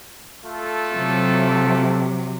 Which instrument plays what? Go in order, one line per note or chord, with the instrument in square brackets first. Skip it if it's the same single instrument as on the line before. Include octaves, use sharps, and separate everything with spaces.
[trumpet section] A3 F4 A4
[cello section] C3 F#3